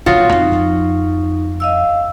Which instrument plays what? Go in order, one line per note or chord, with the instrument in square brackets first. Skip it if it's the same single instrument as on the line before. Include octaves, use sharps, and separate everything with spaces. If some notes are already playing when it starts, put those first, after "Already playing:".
[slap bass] D#1 B1 B2 [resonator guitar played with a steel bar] F4 F#4 [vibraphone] C#5 D#6
[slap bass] F2 C4 [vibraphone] D#4
[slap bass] F2
[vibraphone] D#5 F5 E6